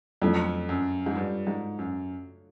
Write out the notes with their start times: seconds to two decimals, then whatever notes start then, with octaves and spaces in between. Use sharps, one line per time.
0.22 F2 F#3 A3 D4 F4
0.69 F#2
1.06 G#2
1.16 G2
1.47 G#2
1.79 F#2